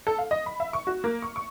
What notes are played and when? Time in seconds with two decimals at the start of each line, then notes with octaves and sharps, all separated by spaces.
0.07 A4
0.18 F5
0.31 D#5
0.46 B5
0.60 E5
0.73 C#6
0.87 F#4
1.04 A#3
1.22 C#6
1.36 C#6